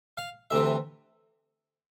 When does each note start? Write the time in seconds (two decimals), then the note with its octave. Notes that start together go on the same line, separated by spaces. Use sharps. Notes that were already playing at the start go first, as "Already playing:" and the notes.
0.17 F5
0.51 D2 C3 E3 E5